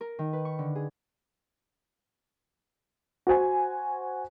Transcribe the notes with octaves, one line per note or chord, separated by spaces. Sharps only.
A#4
D#3
B4
C#6
D3
G#4
F#4 C5 G#5